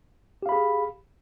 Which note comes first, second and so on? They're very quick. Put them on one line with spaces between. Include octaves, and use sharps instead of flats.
G4 F5 B5 G#4